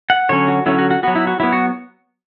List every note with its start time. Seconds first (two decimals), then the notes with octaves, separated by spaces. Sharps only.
0.10 F#5
0.29 D3 F#3 C#4 C#5
0.48 F#4
0.66 D3 F#3 C#4 E4
0.79 F#4
0.91 F#4
1.03 F#3 B3 F#4
1.16 E4
1.27 F#4
1.40 F#3 B3 E4
1.52 F#4